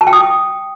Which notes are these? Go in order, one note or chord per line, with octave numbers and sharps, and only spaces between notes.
A5
G5
D#6